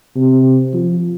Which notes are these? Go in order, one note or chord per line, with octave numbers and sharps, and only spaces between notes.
C3
F3